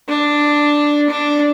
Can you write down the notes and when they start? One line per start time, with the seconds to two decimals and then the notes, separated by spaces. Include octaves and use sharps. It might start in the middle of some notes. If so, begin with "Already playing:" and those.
0.08 D4
1.09 D4